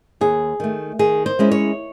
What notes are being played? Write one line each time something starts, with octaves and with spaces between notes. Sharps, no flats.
D#2 G#4
D#3 A3
D#3 G#4
C5
G#3 C#4 E4
C#5